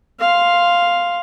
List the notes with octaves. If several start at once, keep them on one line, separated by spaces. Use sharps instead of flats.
F5 C6